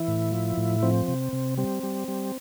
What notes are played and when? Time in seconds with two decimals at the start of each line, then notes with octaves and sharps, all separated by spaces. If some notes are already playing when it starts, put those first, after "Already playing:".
Already playing: E3 E4
0.08 A2
0.32 F3
0.58 A2
0.83 F3 C4
1.08 C3
1.33 C3
1.58 G3 C4
1.83 G3
2.08 G3